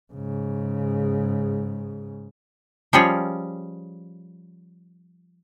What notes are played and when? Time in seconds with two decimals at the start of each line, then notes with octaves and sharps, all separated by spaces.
0.13 G#2 C#3
2.93 F3 G3 C#4 F4 G#4 C#5